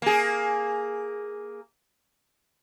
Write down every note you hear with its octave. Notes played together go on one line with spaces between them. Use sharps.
A#3 G#4